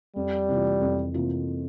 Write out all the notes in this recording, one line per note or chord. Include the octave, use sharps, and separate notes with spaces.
F2 G3
C3 E3 A#3 F4
F2
C3 E3 A#3 F4